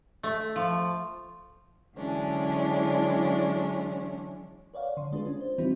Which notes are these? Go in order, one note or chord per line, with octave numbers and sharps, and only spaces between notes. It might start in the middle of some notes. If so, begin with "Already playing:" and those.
A3
F3
D3 E3 F#3 G#3 C#4 D4
B4 C#5 D5 F5 F#5
D3 C6
G#3 D4 F4 G#4 B4
C#4 D4
C5
E3 G3 C4 D#4 E4 F#4